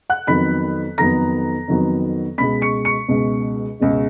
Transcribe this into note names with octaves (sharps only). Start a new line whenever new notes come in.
F#5 F#6
F2 D#3 F#3 B3 B5 B6
F2 D#3 F#3 B3 A#5 A#6
F2 D#3 F#3 B3
C#2 B2 G#3 B5 B6
C#6 C#7
C#6 C#7
C#2 B2 G#3
C#2 B2 G#3